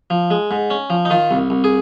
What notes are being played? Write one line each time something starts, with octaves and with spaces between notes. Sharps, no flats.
F3
G#3
G#2
C#4
F3
D#4
D#3 F4
C2
C2
G#4